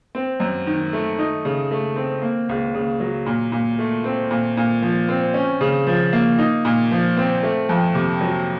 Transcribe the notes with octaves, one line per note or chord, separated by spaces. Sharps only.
C4
F#2
D#3
A3
D#4
C#3
A3
C4
A#3
C#2
C#3
F#3
A#2
A#2
A3
C4
A#2
A#2
F3
C4
C#4
C#3
F3
A#3
D#4
A#2
F3
C4
A3
F2
C3
F#3